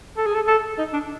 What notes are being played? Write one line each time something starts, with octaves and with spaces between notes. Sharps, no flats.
A4
G#4
A4
A4
D#4
D4